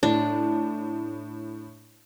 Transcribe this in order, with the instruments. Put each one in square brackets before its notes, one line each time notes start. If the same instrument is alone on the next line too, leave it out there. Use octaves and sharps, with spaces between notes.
[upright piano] A2 [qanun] D4